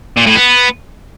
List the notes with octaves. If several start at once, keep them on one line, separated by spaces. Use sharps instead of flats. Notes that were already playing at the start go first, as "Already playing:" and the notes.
A#2
A2
B3